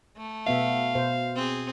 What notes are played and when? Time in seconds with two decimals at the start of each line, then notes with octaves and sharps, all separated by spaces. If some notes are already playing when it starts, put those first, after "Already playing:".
0.17 A3
0.47 B2 B3 E5 F5
0.95 B2 C5
1.36 C4 G#4